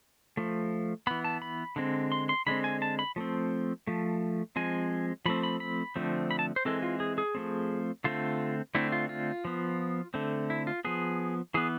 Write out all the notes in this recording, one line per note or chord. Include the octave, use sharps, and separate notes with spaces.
F3 A3
E3 B3 B5
A5
B5
D3 G#3 C4
C6
C6
D3 G#3 C4 B5
G#5
A5
B5
F3 A3 C4
F3 A3
F3 G#3 C4 G#5
F3 A3 C4 B5
B5
B5
D3 F3 A3 C4
B5
A5
C5
E3 G#3 C4 A4
F4
G#4
G#4
F3 A3 C4
D3 A3 C4 F4
D3 A3 C4 E4
F4
F4
F3 B3
D3 A3 C4
E4
F4
F3 B3 G#4
E3 B3 G#4